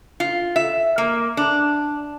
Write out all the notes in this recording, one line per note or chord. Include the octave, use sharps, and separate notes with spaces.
F4
E5
A#3
D4